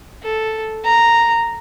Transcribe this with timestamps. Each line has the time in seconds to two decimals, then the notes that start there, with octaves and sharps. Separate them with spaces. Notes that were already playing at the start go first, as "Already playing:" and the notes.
0.23 A4
0.84 A#5